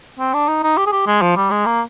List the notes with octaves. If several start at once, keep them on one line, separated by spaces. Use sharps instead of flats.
C4
D4
D#4
D#4
G4
G#4
G4
G#3
F3
G3
G#3
A#3